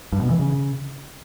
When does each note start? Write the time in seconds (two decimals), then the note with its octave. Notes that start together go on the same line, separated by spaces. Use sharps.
0.12 G2
0.21 B2
0.30 E3
0.39 C#3